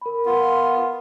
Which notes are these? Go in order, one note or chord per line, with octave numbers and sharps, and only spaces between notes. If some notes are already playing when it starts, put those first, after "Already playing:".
A#4 B5
B3 F4